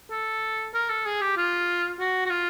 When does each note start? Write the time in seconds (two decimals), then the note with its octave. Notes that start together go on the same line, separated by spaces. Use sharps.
0.11 A4
0.74 A#4
0.89 A4
1.06 G#4
1.21 G4
1.37 F4
2.00 F#4
2.26 F#4
2.30 F4